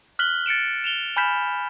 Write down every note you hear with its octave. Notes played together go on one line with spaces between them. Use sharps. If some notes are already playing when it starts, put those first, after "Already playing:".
F6 F#6 B6 F#7 G7
A6 C#7 D7 E7
E7 F7 G7
G#5 B5 F6 G6 B6 E7